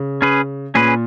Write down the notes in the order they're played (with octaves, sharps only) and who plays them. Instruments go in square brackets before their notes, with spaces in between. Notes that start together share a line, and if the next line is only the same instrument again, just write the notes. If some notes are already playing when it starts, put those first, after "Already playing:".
Already playing: [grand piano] C#3
[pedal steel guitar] C#4 G#4 B4
[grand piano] A#2 [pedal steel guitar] C#4 G#4 B4